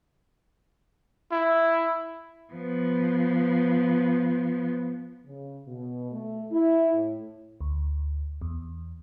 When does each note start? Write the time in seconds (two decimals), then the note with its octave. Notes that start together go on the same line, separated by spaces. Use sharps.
1.31 E4
2.53 F3 B3
5.27 C#3
5.67 B2
6.12 A3
6.51 E4
6.94 A2
7.61 D2
8.41 E2